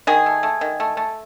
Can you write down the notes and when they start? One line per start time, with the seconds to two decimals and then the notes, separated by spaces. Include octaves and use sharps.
0.07 D#3 G#4
0.26 A3
0.43 A3
0.61 D#3
0.80 A3
0.97 A3